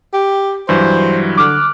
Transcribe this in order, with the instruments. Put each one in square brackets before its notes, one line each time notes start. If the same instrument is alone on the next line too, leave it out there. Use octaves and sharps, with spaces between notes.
[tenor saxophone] G4
[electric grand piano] G2 E3 F#3 [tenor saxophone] C5
[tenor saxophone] D3 [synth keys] D6 F6 F#6